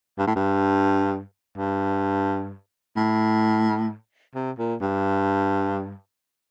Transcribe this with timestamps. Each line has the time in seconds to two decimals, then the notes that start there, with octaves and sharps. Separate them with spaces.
0.19 G2
0.27 A2
0.36 G2
1.58 G2
2.97 A2
4.35 C3
4.58 A#2
4.81 G2